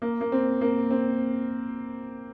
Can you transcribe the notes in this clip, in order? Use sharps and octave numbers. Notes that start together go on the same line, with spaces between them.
A#3
A#3
C4
A#3
C4